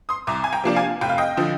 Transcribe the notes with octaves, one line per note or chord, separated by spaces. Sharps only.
C6 D#6
C2 A#5 D6
G#5
G5 A#5
C3 F3 A#3 D4
F5 G#5
F1 G5
F5
D#5 G5
D3 F3